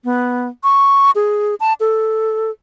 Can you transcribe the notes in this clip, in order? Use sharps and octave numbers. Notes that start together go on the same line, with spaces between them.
B3
C#6
G#4
A5
A4